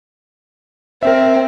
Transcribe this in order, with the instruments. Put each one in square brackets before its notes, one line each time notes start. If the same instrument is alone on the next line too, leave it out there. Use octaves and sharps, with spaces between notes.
[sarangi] C4 [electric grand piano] A#4 E5